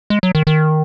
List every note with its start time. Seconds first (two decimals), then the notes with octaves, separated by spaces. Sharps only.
0.10 G#3
0.23 F#3
0.35 D#3
0.47 D#3